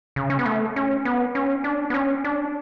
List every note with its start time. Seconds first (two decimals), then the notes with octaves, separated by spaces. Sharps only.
0.16 C#3
0.30 C#4
0.39 B3
0.46 A3
0.76 C#4
1.05 B3
1.35 C#4
1.64 D4
1.90 B3
1.94 C#4
2.24 D4